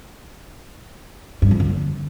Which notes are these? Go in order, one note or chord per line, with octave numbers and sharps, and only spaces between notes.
G2
F2
D3